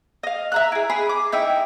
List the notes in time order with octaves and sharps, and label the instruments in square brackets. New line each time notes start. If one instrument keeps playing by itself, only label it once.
[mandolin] D#5 F5
E5 A#5 F#6
E4 G#4
G#4 B5
D6
D#4 E4 E5 G5